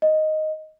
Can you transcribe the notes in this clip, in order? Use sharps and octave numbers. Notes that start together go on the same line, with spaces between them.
D#5